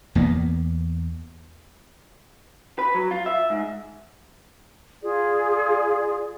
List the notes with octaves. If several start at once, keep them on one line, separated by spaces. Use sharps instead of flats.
E2 A#3 B3
B4
F#3
F4
E5
G#2
F4 G#4 D5